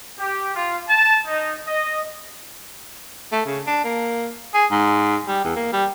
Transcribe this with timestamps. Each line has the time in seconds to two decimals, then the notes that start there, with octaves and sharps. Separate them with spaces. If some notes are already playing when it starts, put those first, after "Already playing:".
0.19 G4
0.55 F4
0.88 A5
1.26 D#4
1.67 D#5
3.32 A3
3.46 C#3
3.67 D4
3.84 A#3
4.54 G#4
4.71 G#2
5.28 G3
5.45 E2
5.56 A#3
5.73 G3